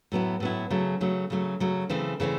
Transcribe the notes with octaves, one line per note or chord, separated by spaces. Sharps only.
A2 F#3 B3 E4
A2 F#3 B3 E4
C#3 F#3 A3
C#3 F#3 A3
C#3 F#3 A3
C#3 F#3 A3
C#3 E3 A3 C4
C#3 E3 A3 C4